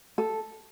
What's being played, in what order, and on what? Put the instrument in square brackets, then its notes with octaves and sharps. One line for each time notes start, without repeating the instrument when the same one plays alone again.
[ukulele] A4